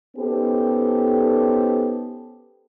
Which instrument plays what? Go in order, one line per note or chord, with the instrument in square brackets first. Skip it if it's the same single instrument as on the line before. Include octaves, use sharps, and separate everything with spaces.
[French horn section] B3 C#4 D#4 G4 A4 C5